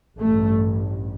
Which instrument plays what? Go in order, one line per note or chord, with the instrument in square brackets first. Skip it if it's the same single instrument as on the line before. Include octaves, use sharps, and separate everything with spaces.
[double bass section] A1 G2 A3